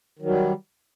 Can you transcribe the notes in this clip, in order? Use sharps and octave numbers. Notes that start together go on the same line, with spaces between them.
D#3 F#3 G3